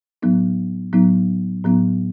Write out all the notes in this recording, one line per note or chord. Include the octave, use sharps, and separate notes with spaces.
A2 F#3 B3 D#4
A2 F#3 B3 D#4
A2 F#3 B3 D#4